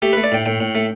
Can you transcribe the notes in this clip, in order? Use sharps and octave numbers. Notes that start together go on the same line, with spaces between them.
A3 G4
A3 B4
D5
A2 G5
A2 G5
A2
A3